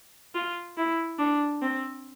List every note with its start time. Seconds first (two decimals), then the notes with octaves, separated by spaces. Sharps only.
0.35 F4
0.78 E4
1.19 D4
1.62 C4